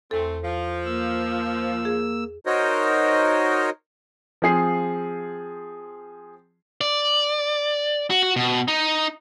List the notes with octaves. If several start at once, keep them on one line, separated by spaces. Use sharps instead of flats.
E2 A3 C4 A4
F3
A#3 E6
G#4
D#4 F#4 A#4 C5 C#5 D#5
F3 C4 G#4 C7
D5
F#4
F#4
B2
D#4